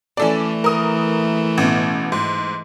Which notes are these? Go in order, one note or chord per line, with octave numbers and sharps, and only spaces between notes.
E3 A3 C#4 A4 D5
A#4 D#6
A1 B2
G#2